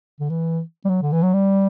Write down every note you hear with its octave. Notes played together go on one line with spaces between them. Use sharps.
D3
E3
G3
F#3
D3
E3
F#3
G3